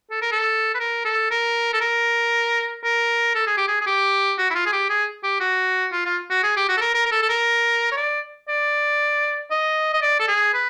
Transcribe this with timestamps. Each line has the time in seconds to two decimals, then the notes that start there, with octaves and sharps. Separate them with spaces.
0.11 A4
0.21 A#4
0.32 A4
0.74 B4
0.79 A#4
1.05 A4
1.31 A#4
1.73 A4
1.81 A#4
2.84 A#4
3.35 A4
3.47 G#4
3.57 G4
3.68 G#4
3.81 G#4
3.86 G4
4.38 F#4
4.50 E4
4.55 F4
4.66 G#4
4.72 G4
4.89 G#4
5.23 G4
5.40 F#4
5.92 F4
6.05 F4
6.30 F#4
6.43 G#4
6.56 G4
6.69 F#4
6.77 A4
6.81 A#4
6.94 A#4
7.06 A#4
7.12 A4
7.22 A4
7.29 A#4
7.92 C#5
7.97 D5
8.48 D5
9.51 D#5
9.94 D#5
10.02 D5
10.19 A4
10.28 G#4
10.54 B4